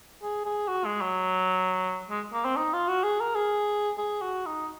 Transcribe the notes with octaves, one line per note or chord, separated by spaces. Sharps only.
G#4
G#4
F#4
G#3
F#3
G#3
A#3
C4
D#4
F4
F#4
G#4
A#4
G#4
G#4
F#4
D#4